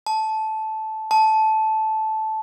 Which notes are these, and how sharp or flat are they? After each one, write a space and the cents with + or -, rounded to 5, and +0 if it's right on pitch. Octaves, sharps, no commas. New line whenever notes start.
A5 -10
A5 -10